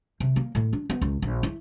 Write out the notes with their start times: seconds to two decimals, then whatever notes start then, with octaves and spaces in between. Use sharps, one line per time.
0.20 C3
0.36 A#3
0.55 A2
0.73 D4
0.90 B3
1.02 C#2
1.22 A#1
1.43 E4